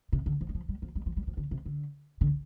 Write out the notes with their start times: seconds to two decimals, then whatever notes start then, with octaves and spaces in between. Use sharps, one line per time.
0.13 C3
0.26 D3
0.41 F3
0.49 G3
0.55 F3
0.69 G3
0.82 F3
0.95 G3
1.06 F3
1.17 G3
1.27 F3
1.37 D3
1.51 C3
1.66 D3
2.21 D3